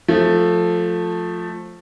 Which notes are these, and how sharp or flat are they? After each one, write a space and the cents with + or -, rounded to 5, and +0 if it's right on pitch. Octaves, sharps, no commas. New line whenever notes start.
F3 +15 A3 +0